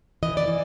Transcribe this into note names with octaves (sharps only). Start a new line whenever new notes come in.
E3 D#5
D5
E3